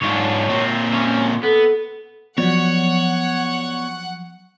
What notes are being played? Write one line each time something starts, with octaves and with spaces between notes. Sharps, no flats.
G#2 D4 F4 C#5
A#2 C4
C#4
B3 A4
F3 F#3 B3 C#5 D5 F#5